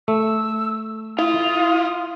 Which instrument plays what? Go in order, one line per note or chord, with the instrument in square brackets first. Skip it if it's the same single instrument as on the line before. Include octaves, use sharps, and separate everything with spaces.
[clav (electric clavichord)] A3 [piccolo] E6
[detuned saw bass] E4 [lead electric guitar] F4 [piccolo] D#6